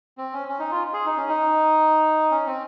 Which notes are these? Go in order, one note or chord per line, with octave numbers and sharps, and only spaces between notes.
C4
C#4
C#4
D#4
F4
G#4
D#4
C#4
D#4
C#4
C4